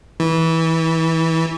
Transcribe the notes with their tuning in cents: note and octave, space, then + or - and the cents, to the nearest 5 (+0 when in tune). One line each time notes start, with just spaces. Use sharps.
E3 -20